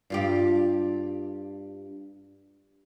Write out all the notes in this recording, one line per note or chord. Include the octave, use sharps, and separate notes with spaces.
G2 F4 G4